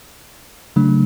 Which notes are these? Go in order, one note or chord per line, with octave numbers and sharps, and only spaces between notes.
C#3 F#3 A3 D4